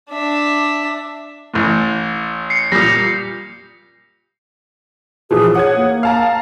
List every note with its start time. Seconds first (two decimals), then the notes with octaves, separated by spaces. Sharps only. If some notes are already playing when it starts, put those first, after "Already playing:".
0.10 D4 E5
1.54 A1 A2
2.50 C7 C#7
2.72 A#2 G3 D#6 G6 A#6
5.31 A#2 E3 F3 G#4
5.55 C#5 F#5 D#6 G#6
5.76 A#3
6.03 F5 A5 A#5